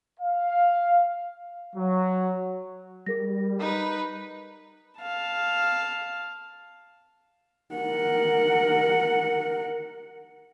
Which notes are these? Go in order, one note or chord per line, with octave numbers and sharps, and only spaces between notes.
F5
F#3
G3 G#4 A#4 A#6
D#4 B4
F5 A5
A#4 F#5